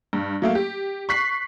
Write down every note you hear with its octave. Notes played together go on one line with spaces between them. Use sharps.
G2
F#3 A3 A#3
G4
C#6 F#6 B6 C7